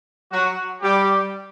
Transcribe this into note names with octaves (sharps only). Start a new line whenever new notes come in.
F#3 F#4
G3 G4